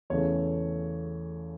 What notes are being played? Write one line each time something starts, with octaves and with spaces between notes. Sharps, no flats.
E2 C#3 E3 A3 C#5